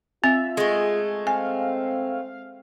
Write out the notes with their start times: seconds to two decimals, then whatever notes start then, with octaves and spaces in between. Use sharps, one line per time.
0.24 C4 F4 E5
0.57 G#3 A3 G#4
1.27 C4 F5 G#5